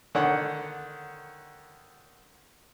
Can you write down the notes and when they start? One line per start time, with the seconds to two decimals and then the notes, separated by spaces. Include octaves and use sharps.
0.15 D3 D#3 C#5 F#5